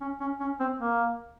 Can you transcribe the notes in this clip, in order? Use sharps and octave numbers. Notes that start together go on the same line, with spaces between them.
C#4
C#4
C#4
C4
A#3